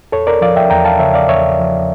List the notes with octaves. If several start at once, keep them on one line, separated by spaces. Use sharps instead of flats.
E2 A4 C#5
A#4 D5
F3 D5 F5
E5 G5
E2 G5 A#5
F5 A5
C#3 C#5 E5
D5 F5
E2 C#5 E5
F3